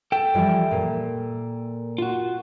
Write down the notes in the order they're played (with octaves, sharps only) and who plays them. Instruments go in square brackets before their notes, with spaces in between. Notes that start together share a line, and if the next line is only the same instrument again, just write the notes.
[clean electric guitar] A4 G5
[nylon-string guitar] E3 F3 G3
A#2
[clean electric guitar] F4 F#4